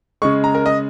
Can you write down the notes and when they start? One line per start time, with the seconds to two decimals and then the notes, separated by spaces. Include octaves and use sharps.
0.22 C#3 G#3 C#6
0.44 A#5
0.55 A#4
0.66 D#5